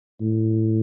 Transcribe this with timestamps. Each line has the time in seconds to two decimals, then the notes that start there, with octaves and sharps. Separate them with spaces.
0.21 A2